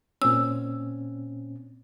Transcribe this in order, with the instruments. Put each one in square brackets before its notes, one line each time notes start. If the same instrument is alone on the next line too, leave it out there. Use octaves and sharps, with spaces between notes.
[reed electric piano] A#2 C4 C#4 [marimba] E6